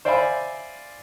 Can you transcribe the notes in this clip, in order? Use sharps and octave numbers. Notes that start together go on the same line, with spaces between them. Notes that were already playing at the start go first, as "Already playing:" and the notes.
C5 D5 E5 F5 G#5 B5